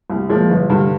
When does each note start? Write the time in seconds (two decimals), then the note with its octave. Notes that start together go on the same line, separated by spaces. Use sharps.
0.10 C2
0.29 A#2 F3 G#3
0.50 G1
0.70 G2 D3